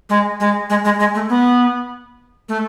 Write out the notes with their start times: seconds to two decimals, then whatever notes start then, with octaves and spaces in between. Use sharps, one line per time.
0.09 G#3
0.40 G#3
0.70 G#3
0.85 G#3
0.99 G#3
1.15 A3
1.29 B3
2.49 A3